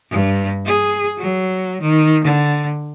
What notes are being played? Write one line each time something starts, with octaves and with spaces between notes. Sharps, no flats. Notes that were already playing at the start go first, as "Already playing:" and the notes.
G2
G#4
F#3
D#3
D3